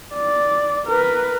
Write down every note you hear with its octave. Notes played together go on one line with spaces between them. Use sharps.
D5
A#4 B4